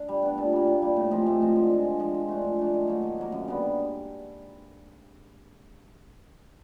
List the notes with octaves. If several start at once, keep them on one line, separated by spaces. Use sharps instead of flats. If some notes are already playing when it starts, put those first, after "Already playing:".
Already playing: D4
G3
B3 D4
A#2
G3 A#3
A#2
G3 A#3
A2
F3 G#3 C4
A2
F3 G#3 C4
D3
F3 G#3
D3
F3 G#3
F3
A3 D4
F3
A3 D4
D#3
F#3 A#3
D#3
F#3 A#3
F#2
D3 G3 B3